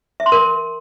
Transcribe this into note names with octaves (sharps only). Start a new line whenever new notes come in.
E5
C6
A#4